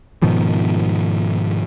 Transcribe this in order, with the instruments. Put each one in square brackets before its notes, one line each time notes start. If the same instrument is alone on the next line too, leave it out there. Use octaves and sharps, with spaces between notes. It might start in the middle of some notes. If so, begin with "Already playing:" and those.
[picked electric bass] G#2 B2 D#3 F3